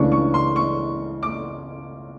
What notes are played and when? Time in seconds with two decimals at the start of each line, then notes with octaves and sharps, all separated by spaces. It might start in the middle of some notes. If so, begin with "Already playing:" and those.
Already playing: C#2 C#3 E3 A3 D4 C#6
0.12 C#6
0.34 C6
0.56 C#6
1.23 D6